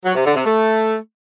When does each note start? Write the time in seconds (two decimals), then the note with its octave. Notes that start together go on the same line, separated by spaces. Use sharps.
0.05 F#3
0.15 C3
0.25 D3
0.35 C3
0.45 A3